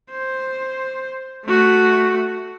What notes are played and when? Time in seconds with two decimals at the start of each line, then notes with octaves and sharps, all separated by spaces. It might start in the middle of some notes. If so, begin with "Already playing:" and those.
0.10 C5
1.46 A3 F#4